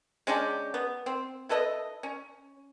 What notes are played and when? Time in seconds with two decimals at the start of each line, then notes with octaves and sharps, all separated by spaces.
0.27 G#3 C#4 D4 G4
0.74 B3
1.06 C4
1.49 E4 A4 B4 D#5
2.03 C#4